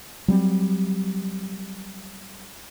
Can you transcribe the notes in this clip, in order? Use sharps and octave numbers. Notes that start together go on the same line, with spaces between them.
F#3 G3 C4